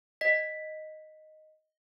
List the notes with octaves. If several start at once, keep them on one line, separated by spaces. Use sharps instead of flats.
D#5 B6